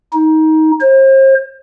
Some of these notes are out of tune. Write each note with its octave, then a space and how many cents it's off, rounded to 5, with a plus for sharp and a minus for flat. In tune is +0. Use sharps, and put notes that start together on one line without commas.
D#4 +20
C5 +40